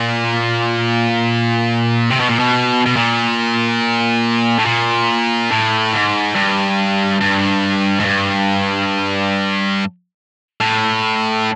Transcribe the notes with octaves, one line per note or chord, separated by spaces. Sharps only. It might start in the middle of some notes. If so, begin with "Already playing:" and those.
Already playing: A#2
C3
B2
A#2
B2
B2
A#2
A2
A#2
A2
G#2
G2
G2
G#2
G2
A2